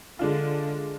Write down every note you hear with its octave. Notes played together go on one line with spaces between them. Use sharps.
D3 G#3 D4 F4